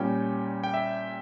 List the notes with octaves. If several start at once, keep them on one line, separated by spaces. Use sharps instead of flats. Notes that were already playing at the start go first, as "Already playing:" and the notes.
Already playing: A#2 G3 C#4 G5
G5
E5